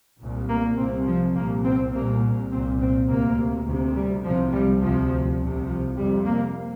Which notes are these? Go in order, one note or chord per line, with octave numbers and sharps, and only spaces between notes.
C2 A#2
A#3
C2 C3 C4
F3
C2 A#2 A#3
C4
C2 A#2 A#3
C2 A#2 C4
C4
D2 C3 A#3
D2 C3
G3
C2 C3 F3
G3
D2 C3 F3
C2 C3
F3
F2 C3 G3
A#3